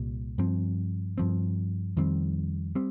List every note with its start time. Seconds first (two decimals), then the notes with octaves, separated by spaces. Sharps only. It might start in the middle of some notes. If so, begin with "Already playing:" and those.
Already playing: C2 A#2 G3
0.38 G2 F3 C4
1.18 G2 F3 C4
1.97 F2 D#3 G3 C4
2.75 G3 C4